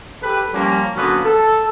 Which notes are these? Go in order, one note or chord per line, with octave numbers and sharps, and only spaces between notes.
G4 A4 B4
F3 G3 A#3 C#4
D3 F#3 A#3 B3 C#4
A4